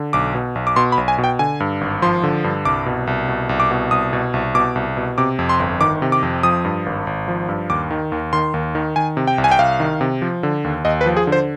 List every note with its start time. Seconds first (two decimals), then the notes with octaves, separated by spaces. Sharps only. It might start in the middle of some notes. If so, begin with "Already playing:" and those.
Already playing: D3
0.13 B1 D6
0.35 B2
0.55 B1
0.67 D6
0.76 B2 C6
0.92 B5
0.98 B1
1.08 G#5
1.18 B2
1.24 G5
1.39 D3 G#5
1.60 G2
1.81 G#1
2.02 F3 C6
2.23 D3
2.44 G2
2.65 C2 D6
2.86 B2
3.07 C2
3.28 B2
3.49 C2
3.60 D6
3.71 B2
3.91 C2 D#6
4.13 B2
4.34 C2
4.55 B2 D6
4.76 C2
4.97 B2
5.18 C3 D6
5.39 F2
5.49 C6
5.59 G1
5.81 D#3 D6
6.02 C3
6.12 D6
6.23 F2
6.43 F3 D#6
6.65 G2
6.86 G#1
7.07 G#1
7.28 F3
7.49 G2
7.70 D#2 D6
7.91 D#3
8.12 D#2
8.33 D#3 C6
8.54 D#2
8.75 D#3
8.96 D#3 G#5
9.17 C3
9.27 G5
9.38 C2
9.44 G#5
9.51 G5
9.59 C2 F5
9.80 D#3
10.01 C3
10.22 F3
10.43 D3
10.64 D#2
10.85 D#2 D#5
11.01 B4
11.06 F3
11.17 G#4
11.27 D3
11.32 C5